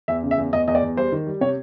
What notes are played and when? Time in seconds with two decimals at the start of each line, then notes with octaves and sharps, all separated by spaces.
0.08 E2 E5
0.23 C#3
0.31 E5
0.38 E2
0.53 E2 D#5
0.67 E2 D#5
0.75 D5
0.82 E2
0.97 G3 C5
1.12 D#3
1.27 G3
1.41 C3 C#5